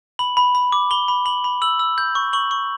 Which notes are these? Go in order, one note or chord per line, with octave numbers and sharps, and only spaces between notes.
B5 F#7
B5
B5
D6
B5 G7
B5
B5 F#7
B5
E6 F#7
E6
G6
C#6
C#6 F#7
C#6